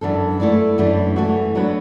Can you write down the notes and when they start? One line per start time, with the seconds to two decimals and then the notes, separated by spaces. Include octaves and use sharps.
0.01 F#2 E3 D4 A4
0.40 A3 E4 B4 D5
0.78 F#2 E3 D4
1.16 E3 A3 F#4
1.55 D3 F#3 B3 D4 B4